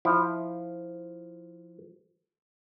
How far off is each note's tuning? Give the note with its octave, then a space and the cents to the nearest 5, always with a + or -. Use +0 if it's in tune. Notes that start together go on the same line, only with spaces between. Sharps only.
F3 -5 E4 +0